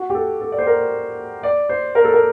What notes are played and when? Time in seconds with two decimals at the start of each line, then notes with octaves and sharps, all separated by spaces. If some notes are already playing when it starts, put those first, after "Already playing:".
Already playing: F#4
0.10 G4
0.14 A4
0.41 A4
0.52 D5
0.58 C5
0.67 A#4
1.43 D5
1.69 C5
1.95 A#4
2.04 A4
2.14 A#4